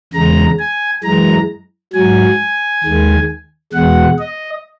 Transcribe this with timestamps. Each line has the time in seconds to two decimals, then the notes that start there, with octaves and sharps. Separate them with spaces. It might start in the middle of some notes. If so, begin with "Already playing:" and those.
0.14 E2 C#3 G#3 A#5
0.59 G#5
1.04 F#2 E3 G#3 A#5
1.93 G#2 F#3 G#5
2.84 D#2 D#3 G#3
3.73 E2 B2 G#3 F#5
4.19 D#5